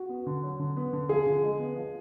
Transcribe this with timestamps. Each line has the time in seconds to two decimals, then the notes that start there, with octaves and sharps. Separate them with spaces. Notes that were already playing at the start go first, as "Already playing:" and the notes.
Already playing: F#4
0.09 B3
0.26 D3
0.43 F#3
0.59 D3
0.76 B3
0.93 D3
1.09 F3 G#4
1.26 D3
1.43 G#3
1.59 B3
1.76 F3